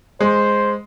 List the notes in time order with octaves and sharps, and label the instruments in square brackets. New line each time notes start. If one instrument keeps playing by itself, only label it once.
[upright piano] G#3 [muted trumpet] C5